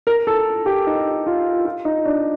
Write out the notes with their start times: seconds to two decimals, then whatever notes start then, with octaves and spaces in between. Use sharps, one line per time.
0.07 A#4
0.27 A4
0.66 G4
0.87 D#4
1.26 F4
1.65 F4
1.85 D#4
2.05 D4